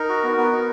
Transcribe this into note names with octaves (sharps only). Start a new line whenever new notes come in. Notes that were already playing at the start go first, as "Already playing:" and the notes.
Already playing: D#4 A#4
F#4
B3
B3
D#4